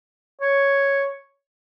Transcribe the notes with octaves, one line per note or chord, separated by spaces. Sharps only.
C#5